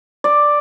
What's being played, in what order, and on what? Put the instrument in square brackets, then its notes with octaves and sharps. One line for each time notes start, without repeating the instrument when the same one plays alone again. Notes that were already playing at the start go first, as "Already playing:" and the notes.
[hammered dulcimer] D5